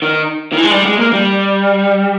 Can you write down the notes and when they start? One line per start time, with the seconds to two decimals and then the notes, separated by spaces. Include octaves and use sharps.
0.02 D#3
0.52 D#3
0.57 E3
0.64 G#3
0.71 G3
0.85 G#3
0.99 A#3
1.13 G3